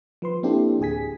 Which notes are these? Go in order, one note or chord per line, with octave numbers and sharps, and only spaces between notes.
F3 B4 C6
A#3 C4 D4 E4 G4 A4
A1 D2 G#4 G#5 B6